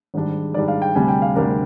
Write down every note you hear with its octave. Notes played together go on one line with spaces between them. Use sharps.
G#1 G#2 G3 D4
G#1 G#2 G3 D4 D5
F5
G5
D2 C3 G3 D4 G#5
G5
F5
D2 C3 G3 D4 A#4